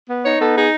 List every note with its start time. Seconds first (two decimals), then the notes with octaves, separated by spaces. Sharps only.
0.09 B3
0.24 D#4 C#5
0.39 B3 A4
0.55 D#4 G#4